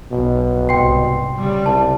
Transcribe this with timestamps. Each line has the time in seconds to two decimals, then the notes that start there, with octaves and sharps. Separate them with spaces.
0.12 B1 B2
0.69 C2 G#2 G5 C6 C7
1.35 C#3 G3
1.66 C2 A5